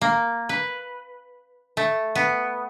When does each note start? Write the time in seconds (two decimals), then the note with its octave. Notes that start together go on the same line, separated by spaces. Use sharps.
0.02 A#3
0.49 B4
1.77 A3
2.15 B3